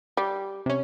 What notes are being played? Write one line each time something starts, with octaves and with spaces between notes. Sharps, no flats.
G3
C3 C#4